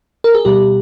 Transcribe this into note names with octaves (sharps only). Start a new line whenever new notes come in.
A#4
G#4
B2 G3 G4